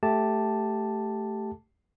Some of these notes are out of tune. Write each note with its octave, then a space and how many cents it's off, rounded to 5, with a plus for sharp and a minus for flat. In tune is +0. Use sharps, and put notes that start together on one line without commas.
A3 +0 G4 +0 A5 +0